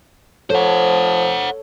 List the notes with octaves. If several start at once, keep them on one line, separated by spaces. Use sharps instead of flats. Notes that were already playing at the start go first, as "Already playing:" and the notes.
F3 A4 C5 C#5 F#5